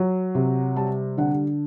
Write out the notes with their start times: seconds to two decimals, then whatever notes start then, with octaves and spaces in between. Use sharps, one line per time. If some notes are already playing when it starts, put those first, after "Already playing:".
Already playing: F#3
0.35 C3
0.76 G3 A5
1.17 D3 F#5